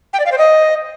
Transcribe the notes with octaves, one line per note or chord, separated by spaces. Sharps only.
G5
D5
F5
C5
D#5